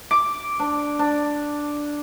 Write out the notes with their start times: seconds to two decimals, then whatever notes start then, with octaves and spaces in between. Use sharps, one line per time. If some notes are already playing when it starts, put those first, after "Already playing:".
0.11 D6
0.60 D4
0.99 D4